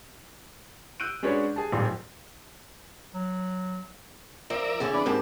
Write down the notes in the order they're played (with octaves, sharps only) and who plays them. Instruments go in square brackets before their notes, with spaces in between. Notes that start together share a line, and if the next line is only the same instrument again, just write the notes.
[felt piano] E6 F#6 G6 D7 D#7
G#3 C#4 D4 F#4 B4 C#5
G#4 A5
D#1 G#1 G#2 F3 G5 C6
[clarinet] F#3
[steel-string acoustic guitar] F3 [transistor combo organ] A#4 D5 E5
[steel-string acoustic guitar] F2 D3 C#4 [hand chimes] G#4 [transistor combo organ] E5
[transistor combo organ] B3 D4 [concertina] E4 D5
[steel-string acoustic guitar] G#2 B2 A5 [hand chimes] C4 A#4 C5 [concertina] G4